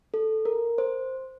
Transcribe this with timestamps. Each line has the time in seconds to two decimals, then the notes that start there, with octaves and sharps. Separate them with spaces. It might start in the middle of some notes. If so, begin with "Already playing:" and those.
0.14 A4
0.45 A#4
0.78 C5